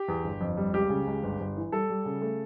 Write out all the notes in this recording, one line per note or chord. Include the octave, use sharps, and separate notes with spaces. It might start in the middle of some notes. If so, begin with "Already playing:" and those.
Already playing: G4
E2
G1
F2
G3
C#2 G4
C#3
C#2
G1
G1
E3
G3 A4
G3
C#3
A3